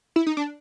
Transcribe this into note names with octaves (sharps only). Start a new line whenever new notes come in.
E4
D#4
D4